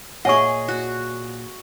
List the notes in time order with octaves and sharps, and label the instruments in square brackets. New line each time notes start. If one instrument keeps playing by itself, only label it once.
[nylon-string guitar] A#2 C#5 E5 [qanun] G#4 D#5 [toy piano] F#5 G#5 C#6
[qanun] F#4